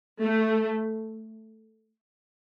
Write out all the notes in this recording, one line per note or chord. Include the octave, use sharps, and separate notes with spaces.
A3